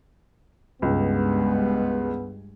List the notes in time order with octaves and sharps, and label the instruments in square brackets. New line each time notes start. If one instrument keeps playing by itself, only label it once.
[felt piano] C#2 [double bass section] G2 G#3 [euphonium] B3